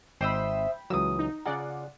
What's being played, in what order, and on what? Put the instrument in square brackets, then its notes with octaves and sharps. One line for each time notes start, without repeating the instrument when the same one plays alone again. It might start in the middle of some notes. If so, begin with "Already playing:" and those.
[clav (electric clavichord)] G#1 [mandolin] C5 D#5 E5 [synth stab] G5 B5
[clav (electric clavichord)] C#2 E3 F#3 [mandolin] D#6 E6
[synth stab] D#4
[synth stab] C#3 D5 F#5 [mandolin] F4 [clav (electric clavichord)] G#4 A#5